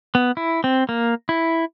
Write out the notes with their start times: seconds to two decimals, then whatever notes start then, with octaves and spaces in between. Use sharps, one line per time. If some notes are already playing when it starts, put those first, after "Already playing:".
0.15 B3
0.37 E4
0.64 C4
0.89 A#3
1.29 E4